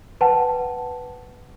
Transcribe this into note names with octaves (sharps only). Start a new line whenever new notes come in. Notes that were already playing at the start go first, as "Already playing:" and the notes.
B4 F#5 G5 A5